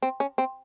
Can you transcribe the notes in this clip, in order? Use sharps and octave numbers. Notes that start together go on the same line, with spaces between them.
C4
C#4
C4